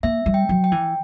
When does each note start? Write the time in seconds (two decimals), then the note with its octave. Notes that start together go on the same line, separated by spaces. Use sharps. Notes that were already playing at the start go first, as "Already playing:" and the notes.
0.03 A#3 E5
0.26 G3
0.34 G5
0.49 F#3
0.64 G5
0.72 E3